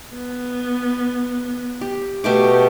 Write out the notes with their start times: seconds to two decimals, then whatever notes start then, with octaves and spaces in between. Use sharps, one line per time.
0.13 B3
1.81 G4
2.24 B2 A3 G4 D6